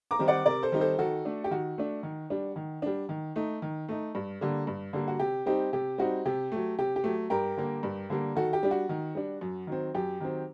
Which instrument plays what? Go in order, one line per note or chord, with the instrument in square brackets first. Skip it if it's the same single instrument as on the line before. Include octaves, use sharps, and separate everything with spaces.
[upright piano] A#5 D6
D#3 G3 C4 D#4
D5 F#5
C3 A#4 D5
A4 C5
D#3 G3 C4 D#4
A4 C5
D#3 F#4 A4
A3 D4
G4
D#3 F#4
A3 D4
D#3
G3 D4
D#3
G3 D4
D#3
A3 D#4
D#3
A3 D#4
G2
D3 G3 A#3
G2
D3 G3 A#3
F#4
C3 G4
G3 C4 D#4 G4
C3 G4
G3 C4 D#4 F#4
C3 G4
F#3 A3
C3 G4
G4
F#3 A3
G2 G4 A#4
D3 G3 A#3
G2
D3 G3 A#3
D#3 F#4 A4
G4
G3 D4
F#4
D#3
G3 D4
F#2
D#3 F#3 C4
F#2 G4
D#3 F#3 C4